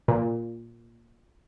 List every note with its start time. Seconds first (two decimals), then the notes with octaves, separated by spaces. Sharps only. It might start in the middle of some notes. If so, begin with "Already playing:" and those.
0.08 A#2